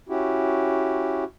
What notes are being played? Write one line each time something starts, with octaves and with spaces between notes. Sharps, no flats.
C#4 E4 F#4 G4